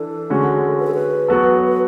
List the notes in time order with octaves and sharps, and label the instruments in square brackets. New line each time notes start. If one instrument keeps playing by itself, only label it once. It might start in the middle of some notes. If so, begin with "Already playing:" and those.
Already playing: [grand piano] E3 D4 [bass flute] A4
[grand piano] D3 G#3 C#4 F#4
[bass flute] B4
A4
B4
[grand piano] F#3 B3 F#4 A4
[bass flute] B4